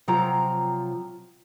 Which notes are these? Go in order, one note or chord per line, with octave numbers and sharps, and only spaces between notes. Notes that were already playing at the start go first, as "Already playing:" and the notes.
C3 F3 F#3 F4 G5 A#5